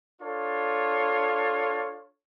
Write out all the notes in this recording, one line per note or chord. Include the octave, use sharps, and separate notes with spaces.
D4 F4 A4 C#5